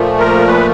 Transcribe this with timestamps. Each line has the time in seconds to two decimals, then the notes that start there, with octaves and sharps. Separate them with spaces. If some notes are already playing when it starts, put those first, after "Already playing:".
Already playing: A#2 F3 A3
0.19 A#4
0.47 B4